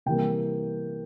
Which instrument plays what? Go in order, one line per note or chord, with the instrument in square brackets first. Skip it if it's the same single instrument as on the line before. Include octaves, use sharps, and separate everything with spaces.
[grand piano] C3 E3 G3 A#3 G5